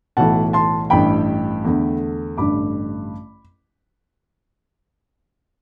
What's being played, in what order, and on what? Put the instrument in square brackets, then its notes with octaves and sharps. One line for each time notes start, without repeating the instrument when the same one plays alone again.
[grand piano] B1 A2 E3 F#5 A5
A5 C6
A1 G2 E3 G5 B5
E2 D3 A3
A1 G2 D3 B5 D6